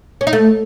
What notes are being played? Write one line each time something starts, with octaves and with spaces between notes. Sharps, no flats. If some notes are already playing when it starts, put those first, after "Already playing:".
C#4
D#4
A3